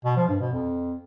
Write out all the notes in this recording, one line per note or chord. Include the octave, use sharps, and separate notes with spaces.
B2
F3
G2
B2
F2